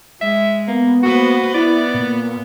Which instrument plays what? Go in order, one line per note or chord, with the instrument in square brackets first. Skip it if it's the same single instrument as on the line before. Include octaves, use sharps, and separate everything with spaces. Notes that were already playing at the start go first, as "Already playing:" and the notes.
[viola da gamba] G#3 [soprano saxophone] E5
[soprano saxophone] A#3 [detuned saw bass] B3
[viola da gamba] A#3 B4 C5 [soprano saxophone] F#4
[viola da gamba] B3 [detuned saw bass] E4 [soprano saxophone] D5
[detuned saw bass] A#2